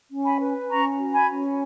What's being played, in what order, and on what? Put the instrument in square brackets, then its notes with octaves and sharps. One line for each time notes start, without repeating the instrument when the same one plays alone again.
[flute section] C#4
G#5 B5
B4
C#4 A#5 C#6
F#4
G#5 B5
C#4